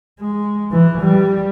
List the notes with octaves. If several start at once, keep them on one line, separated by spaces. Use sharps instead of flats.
G#3
E3
G3